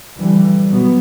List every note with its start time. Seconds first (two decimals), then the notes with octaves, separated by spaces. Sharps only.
0.15 D3 E3 G3
0.70 B2 F#3 B3